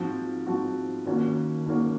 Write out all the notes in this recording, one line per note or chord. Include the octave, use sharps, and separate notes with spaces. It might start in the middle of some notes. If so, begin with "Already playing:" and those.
Already playing: G#2 F3 C4 F#4
G#2 F3 C4 F#4
D#2 D#3 A#3 C#4 F#4
D#2 D#3 A#3 C#4 F#4